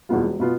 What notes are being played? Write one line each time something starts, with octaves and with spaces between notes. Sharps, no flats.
E2 B2 B3 F4
E1
B2 B3 F4